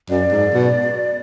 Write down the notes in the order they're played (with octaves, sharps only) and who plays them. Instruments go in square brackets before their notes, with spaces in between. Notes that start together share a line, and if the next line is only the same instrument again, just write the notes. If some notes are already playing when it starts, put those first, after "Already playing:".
[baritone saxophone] F#2 [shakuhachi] D5
[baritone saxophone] G#2
B2